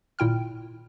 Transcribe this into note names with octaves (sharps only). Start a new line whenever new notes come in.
G#1 A#2 E4 G5 F6